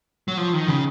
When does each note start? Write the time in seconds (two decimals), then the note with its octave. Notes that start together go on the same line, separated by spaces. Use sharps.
0.28 F#3
0.38 F3
0.54 D#3
0.68 C#3